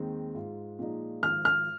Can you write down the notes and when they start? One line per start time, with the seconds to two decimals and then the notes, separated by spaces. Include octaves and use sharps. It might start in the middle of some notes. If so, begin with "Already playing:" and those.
Already playing: D#2 D#3 G#3 C4
0.35 G#2 G#3 F4
0.79 A#2 F3 G#3 D#4
1.23 G#1 G#2 F3 F6
1.45 F6